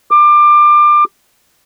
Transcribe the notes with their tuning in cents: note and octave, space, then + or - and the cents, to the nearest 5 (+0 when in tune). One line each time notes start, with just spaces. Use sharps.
D6 +25